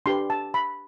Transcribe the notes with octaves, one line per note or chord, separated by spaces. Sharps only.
D4 G4 B4 C6
A5
B5